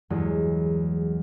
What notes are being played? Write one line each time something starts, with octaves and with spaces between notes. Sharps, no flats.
E2 G2 F#3 G#3